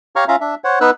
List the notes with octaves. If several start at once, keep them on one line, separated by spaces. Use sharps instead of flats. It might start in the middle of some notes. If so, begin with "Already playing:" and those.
G4 C#5 F5 A#5 C#6 F6
C#4 F4 E5 F5 A#5
D4 E5
C5 C#5 F#5
B3 D#4 B4 E6 F#6